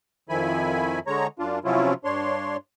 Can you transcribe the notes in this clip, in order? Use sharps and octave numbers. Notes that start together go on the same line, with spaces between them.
F2 D#3 F3 E4 G#5 B5
D3 G#3 C#5 A#5
F#2 D4 F4
C3 F3 F#3 C#4 E4 F4
G2 D4 C#5 C6